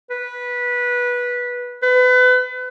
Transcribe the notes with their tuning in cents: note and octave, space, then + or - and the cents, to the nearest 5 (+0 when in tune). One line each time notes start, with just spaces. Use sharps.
B4 -15
B4 +30